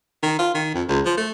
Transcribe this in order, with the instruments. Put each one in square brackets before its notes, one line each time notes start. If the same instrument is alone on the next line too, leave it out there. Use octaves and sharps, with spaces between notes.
[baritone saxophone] D#3
F4
D#3
F2
C#2
F3
A3